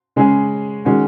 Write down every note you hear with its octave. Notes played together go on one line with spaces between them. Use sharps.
C#3 G#3 C#4 G#4
D#3 G#3 C#4 F#4